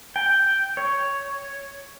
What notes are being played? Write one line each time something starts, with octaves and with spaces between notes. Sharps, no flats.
G5
C#5